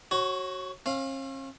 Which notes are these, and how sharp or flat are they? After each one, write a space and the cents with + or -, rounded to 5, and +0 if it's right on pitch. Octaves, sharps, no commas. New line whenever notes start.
F#4 +15 C#5 -25
C#4 -45 F5 +0